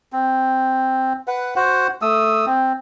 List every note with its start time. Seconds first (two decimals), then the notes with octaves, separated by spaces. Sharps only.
0.13 C4
1.27 B4 F#5
1.56 F#4 C5 F#5
2.02 A3 D#6 E6
2.46 C4